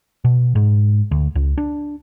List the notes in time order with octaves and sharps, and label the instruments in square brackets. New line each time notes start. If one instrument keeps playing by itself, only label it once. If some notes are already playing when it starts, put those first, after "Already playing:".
[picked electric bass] B2
G#2
D2
C#2
D4